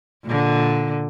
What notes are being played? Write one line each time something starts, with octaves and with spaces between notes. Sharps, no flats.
A#2 D3